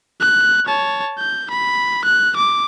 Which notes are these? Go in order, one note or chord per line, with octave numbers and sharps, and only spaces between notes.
F#6
C#5 A5
G6
B5
F#6
D6